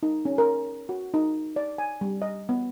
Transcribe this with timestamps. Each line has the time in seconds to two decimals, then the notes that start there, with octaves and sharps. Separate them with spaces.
0.03 D#4
0.25 C#4
0.38 A#4
0.89 F#4
1.14 D#4
1.56 D5
1.78 G#5
2.01 G3
2.22 D#5
2.49 B3